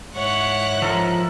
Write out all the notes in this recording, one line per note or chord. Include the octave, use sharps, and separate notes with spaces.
G#2 E4 C#5 F#5 F#6
F3 A4 A#4